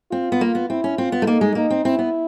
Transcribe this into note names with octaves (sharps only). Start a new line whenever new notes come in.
C4 F4
B3
A#3
B3
C4 E4
C#4
C4 F4
B3
A3
A#3 D#4
G#3
A#3 D#4
C4
C4 E4
B3